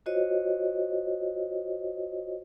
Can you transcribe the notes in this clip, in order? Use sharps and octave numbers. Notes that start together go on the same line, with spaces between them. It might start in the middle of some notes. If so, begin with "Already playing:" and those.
F4 F#4 C5 C#5 D#5